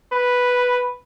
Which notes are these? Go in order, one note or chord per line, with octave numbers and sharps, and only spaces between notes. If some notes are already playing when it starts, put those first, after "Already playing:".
B4